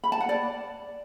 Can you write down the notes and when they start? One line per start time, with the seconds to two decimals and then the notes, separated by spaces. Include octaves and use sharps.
0.04 B5
0.12 A5
0.20 F#5
0.29 D5